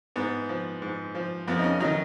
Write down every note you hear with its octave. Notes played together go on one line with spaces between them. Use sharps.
G#2 B3
F3
G#2
F3
F2 B3
D#4
C#4
D#3 F#3 D#4